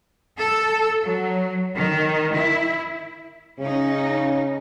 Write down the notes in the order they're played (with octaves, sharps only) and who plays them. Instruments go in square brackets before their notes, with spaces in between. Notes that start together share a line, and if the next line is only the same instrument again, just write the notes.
[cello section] A4
F#3
D#3
E4
[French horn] C#3 [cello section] C#4 D#4